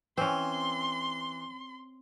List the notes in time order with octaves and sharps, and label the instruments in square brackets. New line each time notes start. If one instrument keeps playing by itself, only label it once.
[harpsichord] E3 [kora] C4 C#4 [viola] C6